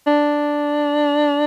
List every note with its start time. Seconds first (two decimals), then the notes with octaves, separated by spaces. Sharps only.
0.07 D4